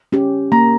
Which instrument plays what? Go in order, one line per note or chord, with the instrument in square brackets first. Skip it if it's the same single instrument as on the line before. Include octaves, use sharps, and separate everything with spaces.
[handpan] C#4 G4
[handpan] A#3 [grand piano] A#5